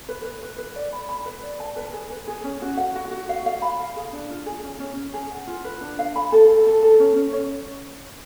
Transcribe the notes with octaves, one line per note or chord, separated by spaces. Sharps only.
B4
B4
B4
B4
D5
B5
B5
B4
D5
A5
B4
G#4
B4
G#4
C#4
F#4
F#5
F#4
F#4
F5
F5
B5
F5
G#4
D4
F4
G#4
C#4
C#4
C#4
G#4
F#5
F4
B4
D4
F5
B5
A4
A4
A4
A4
C#4
C#4
C#5